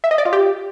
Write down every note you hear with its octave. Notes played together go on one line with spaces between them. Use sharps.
E5
D#5
D5
F4
G4